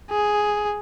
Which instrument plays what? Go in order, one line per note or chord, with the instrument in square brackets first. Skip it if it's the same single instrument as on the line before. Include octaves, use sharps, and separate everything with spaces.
[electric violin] G#4